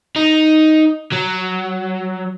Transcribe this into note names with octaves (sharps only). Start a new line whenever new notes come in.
D#4
F#3